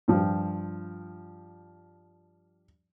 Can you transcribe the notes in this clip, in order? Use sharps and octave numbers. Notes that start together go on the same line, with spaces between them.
G2 F3